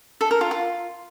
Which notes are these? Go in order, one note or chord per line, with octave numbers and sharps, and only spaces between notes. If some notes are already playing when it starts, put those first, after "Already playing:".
A4
A#4
F4
F4